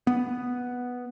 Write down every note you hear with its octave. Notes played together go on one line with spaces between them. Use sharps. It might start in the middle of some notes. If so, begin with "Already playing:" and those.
B3